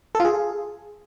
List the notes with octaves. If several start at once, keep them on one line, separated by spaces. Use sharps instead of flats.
A4
F4
G#4